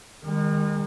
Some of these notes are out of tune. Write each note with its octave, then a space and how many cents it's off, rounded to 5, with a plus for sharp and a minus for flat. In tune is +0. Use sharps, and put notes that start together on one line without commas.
D#3 -5 G#3 -40